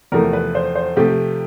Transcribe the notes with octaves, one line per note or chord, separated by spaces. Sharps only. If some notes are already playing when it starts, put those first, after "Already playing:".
E2 C3 F3 A3 A#4
B4
C5
C5
C3 F3 A3 G4